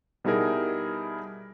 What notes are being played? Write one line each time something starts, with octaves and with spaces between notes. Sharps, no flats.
B2 G3 D#4 E4 G#4 A#4